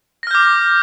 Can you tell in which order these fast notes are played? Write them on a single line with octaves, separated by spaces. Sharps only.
A#6 F6 G6 D6